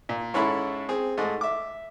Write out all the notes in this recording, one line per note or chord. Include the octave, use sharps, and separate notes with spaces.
A#2
G#2 C#4 E4 A4 B5
C4 G#4
G#2 A3 D#5
E5 D6